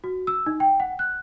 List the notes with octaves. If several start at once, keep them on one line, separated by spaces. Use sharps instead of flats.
F#4
E6
D#4
G5
F#5
F#6